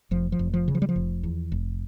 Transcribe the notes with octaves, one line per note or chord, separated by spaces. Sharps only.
F1 F3
F3
F1
F3
C#3
F3
G3
F3
F1
E2
F1